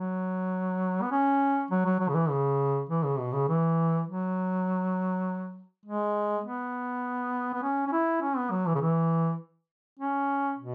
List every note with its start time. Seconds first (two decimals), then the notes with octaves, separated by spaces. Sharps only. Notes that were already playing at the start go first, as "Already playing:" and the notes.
Already playing: F#3
1.02 B3
1.11 C#4
1.71 F#3
1.85 F#3
2.00 F#3
2.09 C#3
2.14 E3
2.29 C#3
2.89 E3
3.04 C#3
3.19 B2
3.33 C#3
3.49 E3
4.07 F#3
5.85 G#3
6.44 B3
7.54 B3
7.63 C#4
7.87 C#4
7.92 E4
8.21 C#4
8.37 B3
8.51 F#3
8.66 E3
8.75 C#3
8.81 E3
9.99 C#4
10.58 B2